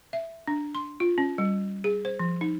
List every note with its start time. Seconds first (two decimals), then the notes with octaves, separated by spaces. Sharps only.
0.13 E5
0.47 D4
0.75 C6
1.00 F4
1.18 C#4
1.38 G3
1.84 G#4
2.05 C5
2.19 F3
2.41 D#4